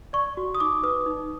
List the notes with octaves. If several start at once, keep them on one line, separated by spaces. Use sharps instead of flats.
D5 C#6
F#4
D#6
D#4 D6
B4 D#6
D#4